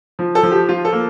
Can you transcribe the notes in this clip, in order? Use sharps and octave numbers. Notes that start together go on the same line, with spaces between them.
F3
A4
F3
G4
F3 F4
A4
A#3